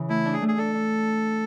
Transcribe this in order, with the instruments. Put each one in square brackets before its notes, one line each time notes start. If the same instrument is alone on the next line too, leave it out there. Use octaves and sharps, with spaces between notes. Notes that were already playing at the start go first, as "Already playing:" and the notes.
Already playing: [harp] C#3 E3
[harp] A3 [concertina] E4
[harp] D4
[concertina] G#4
[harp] A3
[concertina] G#4
[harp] D4 [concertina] A4
[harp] D4